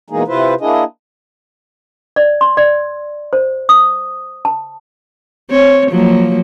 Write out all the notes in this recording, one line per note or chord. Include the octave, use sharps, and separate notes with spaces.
B2 E3 G#3 A#3 D#4 G#4
C3 E4 F4 B4 C5
A#3 D4 E4 G#4 D#5
D5
C6
D5
C5
D#6
A5
C4 C#5
F3 F#3 A#3